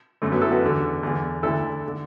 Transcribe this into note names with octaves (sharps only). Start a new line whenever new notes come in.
F#2 D3 A3
F#3 B3
E4 A4
F#4 B4
E2 D3
E2 D3
D2 D3 E4 A4
D3